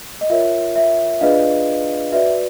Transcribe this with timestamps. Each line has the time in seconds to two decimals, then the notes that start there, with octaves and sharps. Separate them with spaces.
0.21 D#5
0.30 F4 A#4 C#5 E5
0.76 E5
1.21 D4 F4 G#4 B4 D5 D#5 F5
2.12 F#4 B4 D5 E5